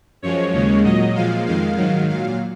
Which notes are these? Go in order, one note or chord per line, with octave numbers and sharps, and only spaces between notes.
F#2 F3 G#3 C#5
D#2 C#3 G#3
A#2 F#3 D#5
A#2 F3 G#3 F5
F2 D#3 G#3 F5
G#2 D#3 F#3
A#2 F#3 F5